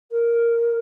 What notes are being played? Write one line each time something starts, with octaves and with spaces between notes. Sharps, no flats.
A#4